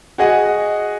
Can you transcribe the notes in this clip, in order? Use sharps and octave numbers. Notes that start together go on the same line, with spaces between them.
F#4 G#4 D#5 F#5